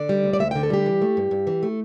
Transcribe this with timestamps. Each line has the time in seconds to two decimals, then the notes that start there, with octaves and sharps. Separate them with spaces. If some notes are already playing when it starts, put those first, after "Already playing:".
Already playing: D3 D5
0.09 G3
0.24 D2
0.33 D5
0.39 D2 E5
0.51 D3 G5
0.63 A4
0.70 G3 G4
0.86 E3
1.02 A3
1.17 G2
1.31 G2
1.47 E3
1.63 A3